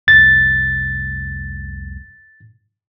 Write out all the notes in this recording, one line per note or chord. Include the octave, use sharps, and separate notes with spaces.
F1 C2 A6